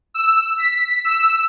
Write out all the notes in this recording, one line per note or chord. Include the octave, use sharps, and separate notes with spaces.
E6
B6
E6